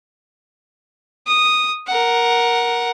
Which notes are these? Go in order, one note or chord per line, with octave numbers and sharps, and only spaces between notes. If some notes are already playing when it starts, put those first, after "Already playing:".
D#6
A#4 F#5